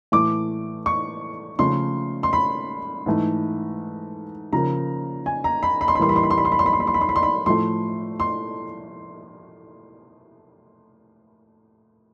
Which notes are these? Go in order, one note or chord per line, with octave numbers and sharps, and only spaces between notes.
A2 E3 A3 D6
C#6
C#3 F3 A3 C6
C6
B5
G#2 E3 A3
C#3 F3 A#3 A#5
G#5
A#5
B5
B5
C6
B5
A2 E3 G3 A#3 C6
B5
C6
B5
C6
B5
C6
B5
C6
B5
C6
B5
C6
B5
C6
B5
C6
B5
A2 F3 A3 C6
C6